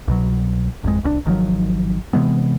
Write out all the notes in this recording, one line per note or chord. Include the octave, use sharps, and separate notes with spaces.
C2 B2 F#3
G#1 F2 G#3
D1 C2 C4 D4
G#1 D#3 F3 F#3
C3 E3 G#3 B3